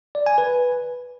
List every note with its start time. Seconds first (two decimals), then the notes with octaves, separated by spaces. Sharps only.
0.15 D5
0.26 G#5
0.38 B4